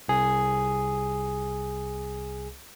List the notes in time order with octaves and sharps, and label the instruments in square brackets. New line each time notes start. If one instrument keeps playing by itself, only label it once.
[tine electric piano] C2 G#4